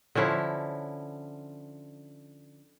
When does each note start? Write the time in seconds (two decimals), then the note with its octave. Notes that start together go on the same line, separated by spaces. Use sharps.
0.15 D3 F3 C#4 E4